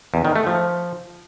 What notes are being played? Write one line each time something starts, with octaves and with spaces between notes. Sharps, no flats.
E2
D#3
A3
F3